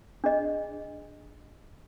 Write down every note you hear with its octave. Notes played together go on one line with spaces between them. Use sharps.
D4 G#4 D#5